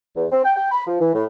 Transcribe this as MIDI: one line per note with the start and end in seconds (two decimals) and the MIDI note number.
0.15 0.25 40
0.31 0.44 60
0.44 0.52 79
0.56 0.70 79
0.71 0.83 83
0.87 0.99 53
1.00 1.13 52
1.14 1.25 45